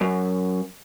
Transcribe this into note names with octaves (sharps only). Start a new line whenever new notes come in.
F#2